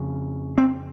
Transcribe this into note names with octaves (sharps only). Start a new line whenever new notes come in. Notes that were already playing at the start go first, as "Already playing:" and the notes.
Already playing: F2 C#3
C4